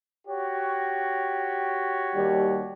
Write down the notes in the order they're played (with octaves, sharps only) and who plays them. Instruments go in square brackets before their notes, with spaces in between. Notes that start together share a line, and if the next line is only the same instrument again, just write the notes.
[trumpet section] F#4 G4 C#5
[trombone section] D#2 G3